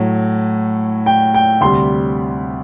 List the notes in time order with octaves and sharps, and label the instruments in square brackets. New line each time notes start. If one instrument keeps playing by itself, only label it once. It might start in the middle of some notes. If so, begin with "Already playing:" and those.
Already playing: [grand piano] A2 F#3
G5
G5
D2 C3 G3 C6